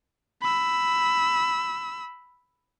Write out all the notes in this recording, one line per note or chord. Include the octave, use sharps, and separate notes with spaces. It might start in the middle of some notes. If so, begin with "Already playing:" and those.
B5 E6